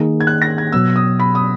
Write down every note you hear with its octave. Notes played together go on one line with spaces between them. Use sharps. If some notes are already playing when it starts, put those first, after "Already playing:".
Already playing: D#3 A#3 D#4 G#4
G#6
F#6
A#6
G#6
B2 F#3 B3 E6
D#6
B5
D#6